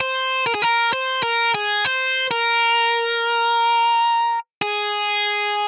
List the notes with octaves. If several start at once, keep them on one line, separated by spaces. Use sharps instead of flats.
C5
A#4
G#4
A#4
C5
A#4
G#4
C5
A#4
G#4